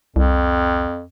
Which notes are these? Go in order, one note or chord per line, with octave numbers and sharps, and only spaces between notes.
C2 F2